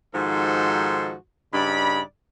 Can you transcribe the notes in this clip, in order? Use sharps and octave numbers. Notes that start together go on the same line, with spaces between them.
G#2 D#3 F3 F#4 A4 C6
G2 C#3 D#4 D5 B5